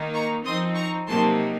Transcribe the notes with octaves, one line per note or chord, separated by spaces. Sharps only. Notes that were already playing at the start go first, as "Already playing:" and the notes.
Already playing: D#3 A#3 D#4
A#5 C#6
F3 C4 D#4 C6 D#6
A#5 C#6
C3 F#3 A#3 D#4 A5 C6